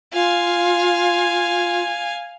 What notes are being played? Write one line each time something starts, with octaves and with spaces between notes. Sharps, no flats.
F4 F5 G#5